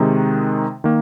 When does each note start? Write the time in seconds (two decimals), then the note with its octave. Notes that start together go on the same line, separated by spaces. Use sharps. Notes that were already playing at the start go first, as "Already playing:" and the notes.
Already playing: C3 D#3 G#3 D#4
0.84 D#3 A#3